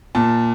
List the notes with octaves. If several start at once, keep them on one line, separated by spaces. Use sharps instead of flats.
A#2 A5